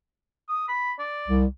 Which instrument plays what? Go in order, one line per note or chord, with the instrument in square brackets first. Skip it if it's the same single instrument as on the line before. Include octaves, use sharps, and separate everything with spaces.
[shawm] D#6
B5
D5
[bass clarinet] C2